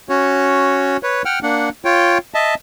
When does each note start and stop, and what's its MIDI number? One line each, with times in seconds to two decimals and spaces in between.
0.09 0.97 61
0.09 0.97 66
0.09 0.97 73
1.03 1.22 71
1.03 1.22 73
1.25 1.39 78
1.25 1.39 79
1.25 1.39 89
1.43 1.69 58
1.43 1.69 62
1.43 1.69 78
1.85 2.18 65
1.85 2.18 73
1.85 2.18 79
2.34 2.55 75
2.34 2.55 76
2.34 2.55 81